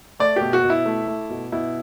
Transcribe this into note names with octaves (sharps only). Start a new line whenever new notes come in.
A3 D5
B2 G4
F#4
B2
E4
A3
A3
B2
B2 E4